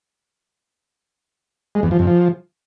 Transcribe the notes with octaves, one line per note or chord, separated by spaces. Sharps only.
G#3
E2
F3
F2
F3